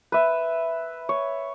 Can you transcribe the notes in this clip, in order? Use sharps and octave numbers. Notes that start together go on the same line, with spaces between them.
B4 E5
C#5